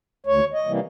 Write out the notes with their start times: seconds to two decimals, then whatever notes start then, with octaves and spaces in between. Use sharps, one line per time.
0.26 D2 C#5
0.53 D#5
0.66 C3 E3 G3 A#3